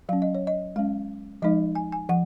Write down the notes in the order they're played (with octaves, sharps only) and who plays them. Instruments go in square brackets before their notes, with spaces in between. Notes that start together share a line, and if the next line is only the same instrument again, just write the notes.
[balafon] F#3 C#4 F5
D#5
C#5
D#5
G#3 C#4 F5
F3 G#3 D#4 D#5
G#5
G#5
F3 F#5